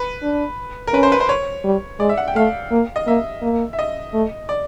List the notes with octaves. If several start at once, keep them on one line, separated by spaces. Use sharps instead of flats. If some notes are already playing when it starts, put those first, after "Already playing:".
Already playing: B4
D4
A#4
C#4 B4
C5
B4
C5
C#5
G3
G#3 D5
E5
F#5
G5
A3 F5
A#3
D#5
A#3 E5
A#3
E5
D#5
A3
D5